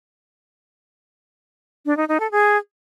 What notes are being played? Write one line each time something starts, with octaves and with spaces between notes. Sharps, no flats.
D4
D#4
D#4
A4
G#4